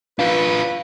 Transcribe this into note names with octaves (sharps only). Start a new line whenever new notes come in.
D4 F4 B4 F5